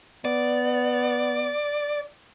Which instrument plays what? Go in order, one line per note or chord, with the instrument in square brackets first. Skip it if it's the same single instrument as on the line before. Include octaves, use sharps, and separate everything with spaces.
[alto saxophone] B3 [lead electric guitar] D5